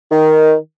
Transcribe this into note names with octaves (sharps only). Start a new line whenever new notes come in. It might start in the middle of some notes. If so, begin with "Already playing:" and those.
D#3